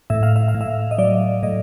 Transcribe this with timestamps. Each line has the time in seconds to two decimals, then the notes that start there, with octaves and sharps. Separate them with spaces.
0.10 A2 E5
0.23 F5
0.36 E5
0.48 F5
0.54 A2
0.61 E5
0.91 D#5
0.98 F#3 D5
1.43 A2 D#5